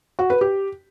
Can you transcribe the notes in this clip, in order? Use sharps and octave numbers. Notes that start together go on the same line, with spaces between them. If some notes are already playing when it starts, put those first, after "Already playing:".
F#4
B4
G4